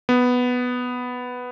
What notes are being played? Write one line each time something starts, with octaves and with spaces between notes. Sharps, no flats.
B3